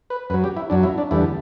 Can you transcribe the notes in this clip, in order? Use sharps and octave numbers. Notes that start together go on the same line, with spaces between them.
B4
F#2 F#3 B4
G4
E4
F#2 F#3 D4
E4
D4
E2 D3 G3 E4